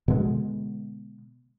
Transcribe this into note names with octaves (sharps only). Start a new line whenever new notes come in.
B2 D3 G#3 B3